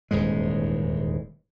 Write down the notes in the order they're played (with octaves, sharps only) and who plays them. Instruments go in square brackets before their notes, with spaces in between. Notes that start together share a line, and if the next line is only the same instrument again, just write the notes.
[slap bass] D#1 E2 G#2 G#3